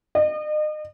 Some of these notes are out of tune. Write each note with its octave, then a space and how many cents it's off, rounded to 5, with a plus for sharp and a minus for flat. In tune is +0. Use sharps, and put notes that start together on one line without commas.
D#5 -35